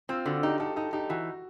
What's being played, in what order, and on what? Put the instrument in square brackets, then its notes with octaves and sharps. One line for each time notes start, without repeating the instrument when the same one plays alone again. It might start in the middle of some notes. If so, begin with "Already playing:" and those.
[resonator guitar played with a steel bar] C4 [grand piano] F4
[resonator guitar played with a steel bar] D3 [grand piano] F#4
[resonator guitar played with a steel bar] D#4 [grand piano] G4
[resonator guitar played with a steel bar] D#4 [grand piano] A4
[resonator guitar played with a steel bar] D#4 [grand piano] A4
[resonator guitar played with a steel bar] D#4 [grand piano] G4
[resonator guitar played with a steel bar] E3 [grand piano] F#4